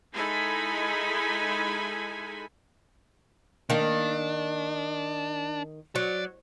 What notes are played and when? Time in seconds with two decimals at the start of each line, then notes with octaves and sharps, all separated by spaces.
0.14 G#3 D#4 E4 A4 G#5 B5
3.70 D#3 A#3 D4
5.95 F#3 D5